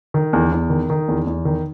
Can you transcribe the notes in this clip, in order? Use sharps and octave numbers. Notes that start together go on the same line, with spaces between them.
D#3
E2
E2
D#3
D#3
E2
E2
D#3